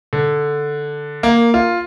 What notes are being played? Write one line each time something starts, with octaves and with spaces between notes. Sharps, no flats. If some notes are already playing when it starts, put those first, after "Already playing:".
D3
A#3
F4